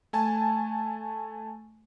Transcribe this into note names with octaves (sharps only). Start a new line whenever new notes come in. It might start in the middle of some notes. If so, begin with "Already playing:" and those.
A3 G#5 A5